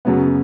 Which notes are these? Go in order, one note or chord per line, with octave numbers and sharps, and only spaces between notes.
F#2 C#3 F#3 B3